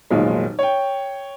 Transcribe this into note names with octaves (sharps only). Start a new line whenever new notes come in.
F1 B1 A#2 D#3 G#3
C#5 G5